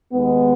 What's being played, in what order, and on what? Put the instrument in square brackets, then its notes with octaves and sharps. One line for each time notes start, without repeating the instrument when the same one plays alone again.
[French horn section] D#2 D#3 G#3 B3